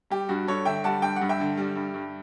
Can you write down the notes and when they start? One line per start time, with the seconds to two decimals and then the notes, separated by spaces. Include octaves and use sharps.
0.10 G3 G4
0.29 G2 F#4
0.47 G2 A4 C#5
0.65 D3 E5 G5
0.84 G3 F#5 A5
1.02 G2 G5
1.16 F#5
1.21 G2
1.29 E5 G5
1.40 D3
1.57 G3
1.76 G2
1.94 G2